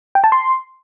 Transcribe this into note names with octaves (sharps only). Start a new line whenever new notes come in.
G5
A5
C6